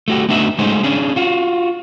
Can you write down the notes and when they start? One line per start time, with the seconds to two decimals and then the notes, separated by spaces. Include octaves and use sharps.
0.08 A3 F#4 G4
0.29 A3 B3 D4 D#4 F#4 E5
0.59 G#3 A3 C#4 D#4 C5
0.83 C#4 D4 G#4
1.16 F4 F#4